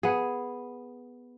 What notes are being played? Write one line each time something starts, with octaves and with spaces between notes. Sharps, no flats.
B3 G#4